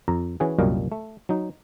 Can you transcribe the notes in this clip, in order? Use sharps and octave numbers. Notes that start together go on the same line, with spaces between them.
F2 A#5
E3 C#4 F#4 G#4
C2 F#2 A#2 G3 D#5 F5
A3
F#3 D#4